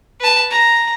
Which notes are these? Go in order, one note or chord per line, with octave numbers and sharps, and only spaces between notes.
B4 A5
A#5